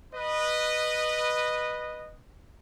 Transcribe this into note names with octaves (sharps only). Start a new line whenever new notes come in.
B4 D#5